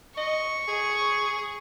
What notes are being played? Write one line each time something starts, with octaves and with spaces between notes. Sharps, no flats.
D#5 C#6
G#4